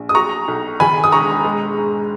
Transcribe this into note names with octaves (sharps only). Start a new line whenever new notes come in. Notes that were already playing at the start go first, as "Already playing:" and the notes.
Already playing: A#1
D#6
F#3 A#5 C#6
B1
D#3 G#5 B5
D#6
E1 A#5 C#6
G#3
G#2